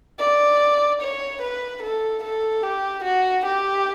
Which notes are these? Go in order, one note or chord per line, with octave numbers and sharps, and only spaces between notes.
D5
C#5
B4
A4
A4
G4
F#4
G4